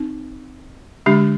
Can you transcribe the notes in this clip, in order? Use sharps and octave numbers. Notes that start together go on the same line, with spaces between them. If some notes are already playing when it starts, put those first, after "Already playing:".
Already playing: C4 D#4
D3 G#3 D4 G4